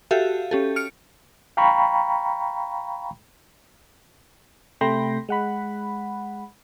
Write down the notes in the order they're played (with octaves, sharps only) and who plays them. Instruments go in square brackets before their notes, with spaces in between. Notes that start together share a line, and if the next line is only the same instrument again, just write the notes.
[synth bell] F#4 G4 A4 E5 F5
C#4 G4 A4
F6 C#7 D7
[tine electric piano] F5 G5 A#5 B5 C#6
[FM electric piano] C3 A3 G5 B5 C6 A#6
G#3 F#5 B5